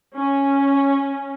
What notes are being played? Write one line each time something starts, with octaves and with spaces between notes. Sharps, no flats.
C#4